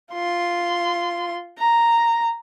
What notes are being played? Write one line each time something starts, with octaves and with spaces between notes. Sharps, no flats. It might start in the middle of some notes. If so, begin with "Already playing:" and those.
F4 C6
A#5